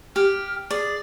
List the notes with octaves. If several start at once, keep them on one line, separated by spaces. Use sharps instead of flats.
G4 F6
G#4 D5